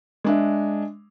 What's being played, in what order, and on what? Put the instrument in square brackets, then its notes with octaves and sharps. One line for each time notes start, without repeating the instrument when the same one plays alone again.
[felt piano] G#3 D4 E5